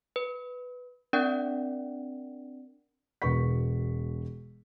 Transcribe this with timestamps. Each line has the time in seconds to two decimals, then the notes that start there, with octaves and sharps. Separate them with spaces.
0.16 B4
1.13 C4 D4 A#4 D5 F#5 G5
3.22 E1 B2 B4 C#6 B6